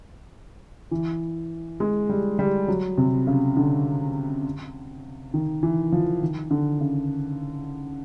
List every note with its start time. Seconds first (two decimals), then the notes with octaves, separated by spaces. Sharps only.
0.91 E3
1.80 G#3
2.09 G3
2.39 G3
2.68 F#3
2.98 C3
3.27 C#3
3.56 D3
5.34 D#3
5.63 E3
5.92 F3
6.22 D#3
6.51 D3
6.81 C#3